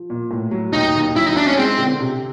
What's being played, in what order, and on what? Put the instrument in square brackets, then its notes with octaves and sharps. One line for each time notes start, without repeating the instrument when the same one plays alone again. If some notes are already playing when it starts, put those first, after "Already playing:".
Already playing: [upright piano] F3
A#2
A2
F#3
[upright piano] D#2 [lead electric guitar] D#4
[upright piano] D#2
[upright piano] F#3 [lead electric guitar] E4
[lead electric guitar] D#4
[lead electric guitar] D4 [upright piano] E4
[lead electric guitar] C#4
[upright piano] G#3 [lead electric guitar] C4
[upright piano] D3
C3